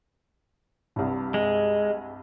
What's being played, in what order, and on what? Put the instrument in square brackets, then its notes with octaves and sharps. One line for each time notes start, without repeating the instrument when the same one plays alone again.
[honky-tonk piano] C2 G2
[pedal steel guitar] G#3